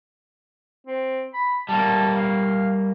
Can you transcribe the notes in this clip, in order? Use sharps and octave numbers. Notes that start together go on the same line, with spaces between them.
C4
B5
G3 A#3 A5
F5